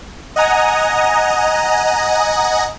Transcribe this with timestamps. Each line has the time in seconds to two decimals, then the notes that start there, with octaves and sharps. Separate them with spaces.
0.36 D#5 F#5 G#5 A#5 D#6